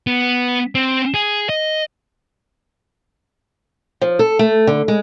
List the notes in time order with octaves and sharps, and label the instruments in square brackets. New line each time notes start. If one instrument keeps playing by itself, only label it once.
[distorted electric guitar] B3
C4
G#4
D#5
[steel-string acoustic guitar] F3
A4
A3
D3
G#3